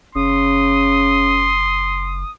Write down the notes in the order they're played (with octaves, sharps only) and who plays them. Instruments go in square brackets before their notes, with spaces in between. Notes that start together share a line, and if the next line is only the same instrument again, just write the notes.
[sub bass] F#1 [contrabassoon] C#3 [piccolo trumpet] C6 [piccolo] D#6